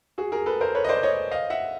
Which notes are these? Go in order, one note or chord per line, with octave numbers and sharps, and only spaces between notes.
F#4 G#4
G#4 A#4
A4 B4
A#4 C5
B4 C#5
D#5
C5 D5
C#5 D#5
D#5 F5
E5 F#5